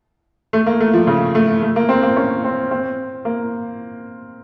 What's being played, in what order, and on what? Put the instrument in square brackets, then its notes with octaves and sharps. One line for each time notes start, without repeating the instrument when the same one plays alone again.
[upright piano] A3
A#3
A3
F3
C#3
A3
A3
A#3
C4
A#3
C#4
C4
C4
A#3